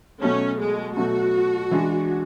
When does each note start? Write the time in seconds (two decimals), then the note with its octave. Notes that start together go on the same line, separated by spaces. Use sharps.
0.22 B2 F#3 A3 C#4
0.59 G#3
0.96 B2 F#3 A3 F#4
1.71 E3 G#3 D4